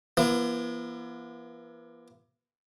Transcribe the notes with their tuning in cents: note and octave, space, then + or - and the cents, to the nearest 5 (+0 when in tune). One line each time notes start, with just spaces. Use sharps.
E3 +45 B3 -40